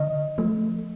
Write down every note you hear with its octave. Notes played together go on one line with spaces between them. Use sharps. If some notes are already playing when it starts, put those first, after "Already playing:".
Already playing: D3 D#5
F3 A3